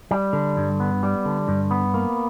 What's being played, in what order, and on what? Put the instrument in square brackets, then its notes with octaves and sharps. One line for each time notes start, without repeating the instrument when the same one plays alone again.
[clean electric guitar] G3
D3
G2
B3
G3
D3
G2
B3
A#3